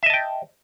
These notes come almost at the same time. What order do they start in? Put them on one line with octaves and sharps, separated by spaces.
E5 D#5 A5 G5